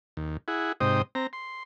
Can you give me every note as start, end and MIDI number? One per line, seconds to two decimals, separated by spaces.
0.17 0.37 39
0.48 0.72 64
0.48 0.72 68
0.48 0.72 78
0.80 1.02 44
0.80 1.02 48
0.80 1.02 63
0.80 1.02 72
0.80 1.02 79
0.80 1.02 87
1.15 1.27 60
1.15 1.27 82
1.33 1.63 84